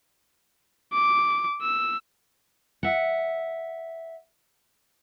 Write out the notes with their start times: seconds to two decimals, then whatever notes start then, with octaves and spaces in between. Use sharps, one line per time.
0.93 D6
1.62 E6
2.83 E5 F#5